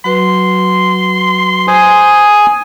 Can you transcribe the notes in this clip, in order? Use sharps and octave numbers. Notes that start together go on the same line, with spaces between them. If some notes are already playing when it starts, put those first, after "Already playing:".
F#3 F#4 B4 C6
C5 G#5 D#6